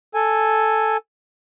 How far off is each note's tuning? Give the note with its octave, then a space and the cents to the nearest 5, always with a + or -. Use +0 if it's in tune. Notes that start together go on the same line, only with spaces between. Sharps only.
A4 +0 G#5 +0